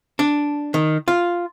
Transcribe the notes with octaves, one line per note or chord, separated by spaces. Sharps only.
D4
D#3
F4